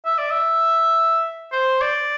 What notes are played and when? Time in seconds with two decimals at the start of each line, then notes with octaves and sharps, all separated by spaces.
0.05 E5
0.18 D5
0.31 E5
1.52 C5
1.81 D5